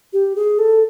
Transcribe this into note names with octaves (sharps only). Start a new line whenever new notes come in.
G4
G#4
A4